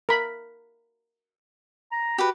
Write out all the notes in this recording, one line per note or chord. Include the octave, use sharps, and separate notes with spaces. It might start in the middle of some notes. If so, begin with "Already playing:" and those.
A#4 B5
A#5
F#4 G4 B4